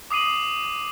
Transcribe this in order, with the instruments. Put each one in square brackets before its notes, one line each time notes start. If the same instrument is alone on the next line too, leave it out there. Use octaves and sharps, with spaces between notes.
[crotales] D6 D#6 C7 D#7 F#7